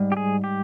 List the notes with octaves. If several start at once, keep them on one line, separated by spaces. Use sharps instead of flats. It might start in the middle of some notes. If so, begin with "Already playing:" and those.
Already playing: G#2 G3
G4
G#4
G4